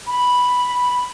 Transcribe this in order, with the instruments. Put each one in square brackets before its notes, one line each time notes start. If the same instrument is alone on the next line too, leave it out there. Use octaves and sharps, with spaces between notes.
[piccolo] B5